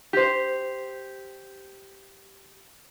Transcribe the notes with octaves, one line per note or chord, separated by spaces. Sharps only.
G4 C5